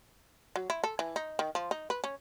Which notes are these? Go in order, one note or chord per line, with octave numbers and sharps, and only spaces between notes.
F#3
E4
A4
E3
D#4
D#3
F3
D#4
B4
C#4